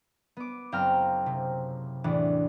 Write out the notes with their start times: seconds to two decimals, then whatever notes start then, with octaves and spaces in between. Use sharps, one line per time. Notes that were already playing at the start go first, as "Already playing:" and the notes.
0.37 B3 D6
0.72 F#1 C4 F5 G5 A#5 F6
1.26 C3
2.04 E2 A2 E3 D4